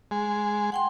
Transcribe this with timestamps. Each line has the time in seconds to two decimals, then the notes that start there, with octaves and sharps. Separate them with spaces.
0.11 G#3
0.72 F#5 G5 C6